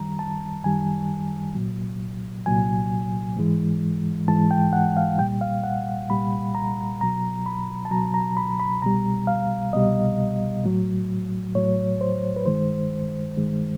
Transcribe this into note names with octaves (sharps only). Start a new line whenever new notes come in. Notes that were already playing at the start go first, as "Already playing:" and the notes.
Already playing: F#2 D#3 G3 A#5
A5
F#2 D#3 G3 G#5
C2 A#2 F#3
C2 A#2 F#3 G#5
G#2 E3 G#3
G#2 E3 G#3 A5
G5
F#5
F5
C2 A#2 G3 G5
F5
F#5
C2 A#2 G3 B5
A#5
C#2 B2 F#3 A#5
B5
A5
C#2 B2 F#3 A#5
A#5
B5
B5
C2 B2 G3 A#5
F5
C2 B2 G3 D#5
A2 F#3
A2 F#3 C#5
C5
B4
G2 D#3 G#3 C5
G2 D#3 G#3